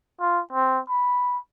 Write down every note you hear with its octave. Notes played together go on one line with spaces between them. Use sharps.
F4
C4
B5